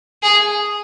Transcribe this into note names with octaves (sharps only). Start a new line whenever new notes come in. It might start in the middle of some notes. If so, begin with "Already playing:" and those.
G#4